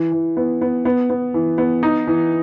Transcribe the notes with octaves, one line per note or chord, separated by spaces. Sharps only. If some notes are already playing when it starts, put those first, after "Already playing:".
Already playing: E3
E3
B3
B3
B3
B3
E3
B3
D#4
E3